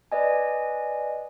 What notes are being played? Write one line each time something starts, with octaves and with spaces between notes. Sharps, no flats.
B4 D5 D#5 G#5